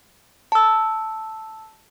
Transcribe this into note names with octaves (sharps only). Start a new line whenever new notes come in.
A5 E6